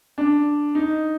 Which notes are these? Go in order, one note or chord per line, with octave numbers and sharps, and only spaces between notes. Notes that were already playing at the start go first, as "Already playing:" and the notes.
D4
D#4